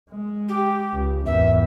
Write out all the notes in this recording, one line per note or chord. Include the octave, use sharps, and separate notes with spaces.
G#3
G4
C#2
G#1 E2 E5